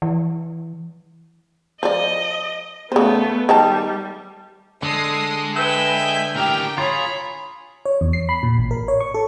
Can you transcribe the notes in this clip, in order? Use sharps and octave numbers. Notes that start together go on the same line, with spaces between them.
E3
F3 D5 D#5
C#3 A3 B3 C5
D#3 G3 G5 A5
D3 G#3 A4 D#6 C7
B4 E5 G5 G#5 E6
G#5
A2 G4 A#4 G5
F4 G#4 C#5 A#5 B5
C#5
E2
C7
B5
A#2
A1
A#4
C#5
C#6
A4